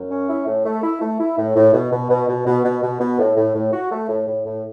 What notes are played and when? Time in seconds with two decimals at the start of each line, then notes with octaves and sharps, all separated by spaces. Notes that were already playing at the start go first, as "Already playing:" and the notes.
Already playing: F#2
0.11 C#4
0.30 E4
0.47 A2
0.65 A3
0.83 E4
1.02 A3
1.20 E4
1.38 A2
1.56 A2
1.74 B2
1.92 B2
2.10 B2
2.29 B2
2.46 B2
2.64 B2
2.82 B2
3.00 B2
3.19 A2
3.37 A2
3.55 A2
3.73 F#4
3.91 A3
4.09 A2
4.27 A2
4.46 A2